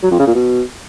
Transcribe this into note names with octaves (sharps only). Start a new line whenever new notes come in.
F#3
F2
C#3
A#2
B2